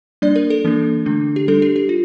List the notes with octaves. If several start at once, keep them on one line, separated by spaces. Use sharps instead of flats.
G3 A#3 D4 D5
A#4
A4
E3 A#3 D4
D3 A3 D4
G4
G3 D4 A4
G4
G4
F4